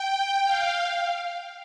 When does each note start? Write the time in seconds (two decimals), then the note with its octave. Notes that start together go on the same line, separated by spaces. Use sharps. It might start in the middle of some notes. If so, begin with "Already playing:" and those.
Already playing: G5
0.45 F5